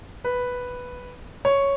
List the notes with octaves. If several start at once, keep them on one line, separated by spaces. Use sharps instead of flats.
B4
C#5